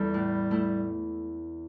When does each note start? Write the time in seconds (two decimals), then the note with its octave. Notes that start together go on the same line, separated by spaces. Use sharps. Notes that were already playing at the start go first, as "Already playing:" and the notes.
Already playing: E2 E3 G3 E4 A4
0.14 A2
0.51 A3 E4